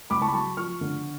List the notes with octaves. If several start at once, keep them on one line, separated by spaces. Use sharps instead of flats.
C#2 B5 D6
A5 C#6
B5
F#3 A5 C#6
F3 C#6 F6
D3